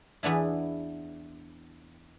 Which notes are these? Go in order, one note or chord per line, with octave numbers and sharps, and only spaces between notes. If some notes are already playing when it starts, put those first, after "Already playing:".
E2 B3 D4 E4